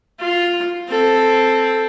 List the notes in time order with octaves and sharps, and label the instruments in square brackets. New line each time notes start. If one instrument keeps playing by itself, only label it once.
[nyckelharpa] F4
C4 A4